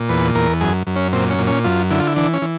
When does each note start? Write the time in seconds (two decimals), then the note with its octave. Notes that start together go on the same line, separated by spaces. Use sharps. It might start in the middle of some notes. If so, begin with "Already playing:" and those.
Already playing: A#2
0.09 E2 B4
0.35 E2 A#4
0.61 F#2 G#4
0.87 F#2
0.96 C#4
1.13 A#2 C4
1.30 C#4
1.39 A#2
1.47 C#4
1.65 F#2 F4
1.90 D3 E4
1.99 F4
2.07 E4
2.16 E3 D4
2.34 C#4
2.42 E3